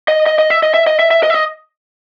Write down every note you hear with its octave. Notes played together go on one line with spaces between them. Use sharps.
D#5
D#5
D#5
E5
D#5
E5
D#5
E5
E5
D#5
E5
D#5